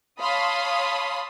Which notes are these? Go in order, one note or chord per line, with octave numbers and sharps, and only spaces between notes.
C#5 F5 A5 B5 C6 D#6